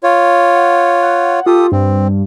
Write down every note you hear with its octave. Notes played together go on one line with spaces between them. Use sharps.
F4 C#5
F#5
F#5
F4 G4 A4 D#6
G2 C4